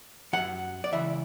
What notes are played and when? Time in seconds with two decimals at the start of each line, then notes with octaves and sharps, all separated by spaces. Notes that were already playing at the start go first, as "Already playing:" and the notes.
0.33 F#2 E3 F#5
0.84 D5
0.92 C#2 C#3 E3 E5